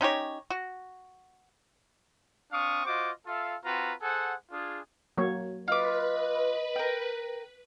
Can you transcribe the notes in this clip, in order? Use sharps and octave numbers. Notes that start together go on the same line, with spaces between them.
C#4 D#4 G4 C#5
F#4
C4 D4 F5 C#6 D#6
F4 F#4 C5 D#5 D6
F4 A4 E5 F5
C4 F4 F#4 B4 A#5
G#4 A4 C5 F#5
D4 F4 G#4
F#3 A#3 C#5
F4 B4 D#5 D6
A#4 G5